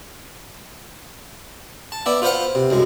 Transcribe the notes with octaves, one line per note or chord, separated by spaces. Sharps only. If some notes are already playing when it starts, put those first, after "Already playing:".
A5
B3 E4 D5 E5
F4 B4 C5 F5 F#5
C3
C2 F#2 G#3